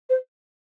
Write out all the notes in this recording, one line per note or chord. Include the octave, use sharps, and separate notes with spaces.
C5